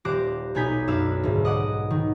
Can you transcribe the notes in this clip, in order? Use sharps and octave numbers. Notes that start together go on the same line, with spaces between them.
D#1 G4 C5 D6 F#6 A#6
B1 B3 D#4 G#5 G6 B6
F#2 D4 B4 F5 E6
D2 G#2
D#5 F#5 D6
D#3